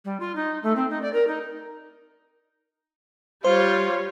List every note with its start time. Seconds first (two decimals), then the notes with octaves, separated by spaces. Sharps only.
0.04 G3
0.19 F4
0.35 D#4
0.62 A3
0.75 C4
0.89 D#4
1.02 D5
1.13 A#4
1.27 D#4
3.44 G3 F4 C5 C#5